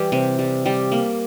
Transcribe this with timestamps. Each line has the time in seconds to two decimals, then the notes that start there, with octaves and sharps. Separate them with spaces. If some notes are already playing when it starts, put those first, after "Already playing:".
Already playing: E3 G3
0.12 C3
0.39 G3
0.66 G3
0.92 A#3